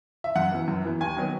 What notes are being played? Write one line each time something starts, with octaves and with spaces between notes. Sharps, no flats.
E5
F#2 F#5
E3 B3
F#2
E3 B3
D#2 G#5
D#3 F#3 B3